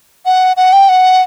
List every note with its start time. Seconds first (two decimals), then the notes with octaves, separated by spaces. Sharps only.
0.26 F#5
0.57 F#5
0.73 G5
0.89 F#5